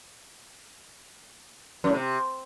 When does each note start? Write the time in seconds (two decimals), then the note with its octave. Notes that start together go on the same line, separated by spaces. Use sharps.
1.84 F#2
1.89 A2
1.94 C3